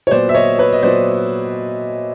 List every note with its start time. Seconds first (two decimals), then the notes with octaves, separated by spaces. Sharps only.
0.07 C#5
0.11 A#2 F#3 B3 C5 D5
0.29 E5
0.34 C#5 D#5
0.59 B4 C#5
0.73 D#5
0.82 A#2 F#3 B3 C5 D5